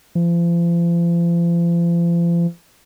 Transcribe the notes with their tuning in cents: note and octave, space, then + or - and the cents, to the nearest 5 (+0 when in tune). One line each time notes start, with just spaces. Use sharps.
F3 -40